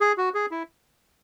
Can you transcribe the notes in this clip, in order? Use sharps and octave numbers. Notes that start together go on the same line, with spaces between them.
G#4
F#4
G#4
E4